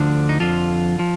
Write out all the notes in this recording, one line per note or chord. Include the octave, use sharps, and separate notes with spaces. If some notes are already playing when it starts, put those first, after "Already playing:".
Already playing: D2 D3 F3 D4
D#4
F2 D3 F3 F4
F3